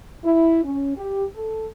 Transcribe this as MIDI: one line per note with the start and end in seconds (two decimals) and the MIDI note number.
0.24 0.63 64
0.64 0.96 61
0.96 1.24 67
1.35 1.66 69